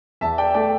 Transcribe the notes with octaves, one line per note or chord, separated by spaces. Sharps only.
E2 E5 A5
D5 G5
A3 D5 G5